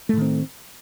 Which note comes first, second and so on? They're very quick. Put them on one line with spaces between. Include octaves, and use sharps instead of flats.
A3 A2 D#3 C4